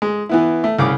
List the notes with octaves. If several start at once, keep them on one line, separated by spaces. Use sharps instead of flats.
G#3
E3 B3 E4
A3
C2 C#3 D6